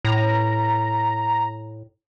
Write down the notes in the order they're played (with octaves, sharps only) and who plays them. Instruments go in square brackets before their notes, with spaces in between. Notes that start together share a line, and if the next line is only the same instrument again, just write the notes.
[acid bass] A2 [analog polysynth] A#5